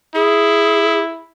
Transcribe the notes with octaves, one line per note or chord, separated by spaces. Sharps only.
E4 G#4